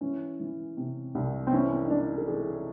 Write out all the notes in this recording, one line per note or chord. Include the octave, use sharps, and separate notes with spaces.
E3 C#4
E3
C3
C2
C4
E3 C#4
D#4
E3 D4
A4
E3 G#4